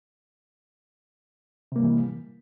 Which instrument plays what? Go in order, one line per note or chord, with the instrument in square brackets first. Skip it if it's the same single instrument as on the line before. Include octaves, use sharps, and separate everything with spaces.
[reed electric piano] C3
A#3
G3
E3